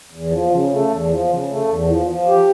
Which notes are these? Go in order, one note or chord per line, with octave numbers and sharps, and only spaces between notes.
E2
F3
C#3
A3
E2
F3
C#3
A3
E2
F3
F3
G4